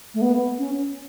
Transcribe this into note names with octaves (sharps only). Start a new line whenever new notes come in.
A3
B3
C#4